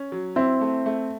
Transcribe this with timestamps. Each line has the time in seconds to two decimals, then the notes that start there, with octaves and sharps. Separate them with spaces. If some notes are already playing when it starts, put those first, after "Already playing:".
Already playing: C#4
0.12 F#3
0.36 C4 E4
0.61 A3
0.86 A3